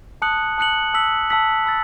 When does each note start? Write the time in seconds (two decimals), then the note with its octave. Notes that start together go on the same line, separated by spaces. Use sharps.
0.22 A5 D#6 F#6 C#7 F#7
0.58 A5 D#6 F#6 C#7 F#7
0.94 A5 E6 B6 F#7
1.30 A5 E6 B6 F#7
1.66 B5 E6 A6